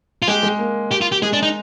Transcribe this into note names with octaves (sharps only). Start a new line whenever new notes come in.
F4
G#3 G4
G#3
A#3
G4
F4
G4
G#3 G#4
D4
D#4